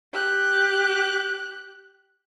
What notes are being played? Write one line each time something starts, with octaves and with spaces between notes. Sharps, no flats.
G4 F#6